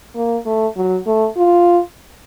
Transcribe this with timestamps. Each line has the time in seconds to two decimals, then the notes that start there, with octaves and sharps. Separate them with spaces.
0.16 A#3
0.46 A3
0.77 F#3
1.06 A3
1.37 F4